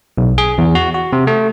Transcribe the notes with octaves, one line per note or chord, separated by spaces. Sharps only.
B1
G#4
E2
F#4
F#4
C3
A3